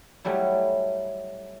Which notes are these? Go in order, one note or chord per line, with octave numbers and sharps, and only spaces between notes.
F#3 G3 A3 E4